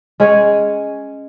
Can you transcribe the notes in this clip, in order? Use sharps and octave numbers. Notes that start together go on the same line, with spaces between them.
G#3 C#4 G#4 C#5